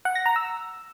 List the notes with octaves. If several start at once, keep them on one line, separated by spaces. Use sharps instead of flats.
F#5
A#6
A#5
E6